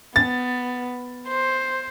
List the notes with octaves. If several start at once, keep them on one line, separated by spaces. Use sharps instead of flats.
B3 A6
C5